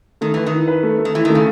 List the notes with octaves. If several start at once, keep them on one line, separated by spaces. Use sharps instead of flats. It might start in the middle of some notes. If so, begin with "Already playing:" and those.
D#3 A3
E3 B4
D#3
E4
B4
A3
A3
D#3
E3 E4
D#3 A3
C#3